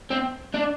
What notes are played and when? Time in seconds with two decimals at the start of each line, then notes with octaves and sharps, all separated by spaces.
0.11 C4
0.54 D4